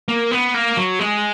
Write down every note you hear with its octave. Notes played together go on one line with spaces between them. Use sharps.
A#3
B3
A#3
F#3
G#3